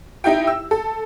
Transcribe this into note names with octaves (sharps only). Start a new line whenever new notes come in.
D#4 E4 G4 G5
E6
A4